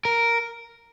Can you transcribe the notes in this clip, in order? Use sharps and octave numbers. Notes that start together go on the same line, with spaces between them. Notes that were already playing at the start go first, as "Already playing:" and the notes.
A#4